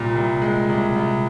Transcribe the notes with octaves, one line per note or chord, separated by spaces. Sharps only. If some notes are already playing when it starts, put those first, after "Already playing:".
Already playing: C2 A#2
C2
G#3
C2
C2